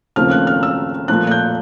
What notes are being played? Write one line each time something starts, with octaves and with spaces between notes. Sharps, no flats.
D#2 C#3 F3 A3 C4 F6
F#6
F6
E6
A#2 F3 A3 F#6
F#6
G6